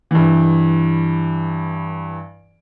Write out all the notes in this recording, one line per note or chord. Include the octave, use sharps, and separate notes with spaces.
G2 E3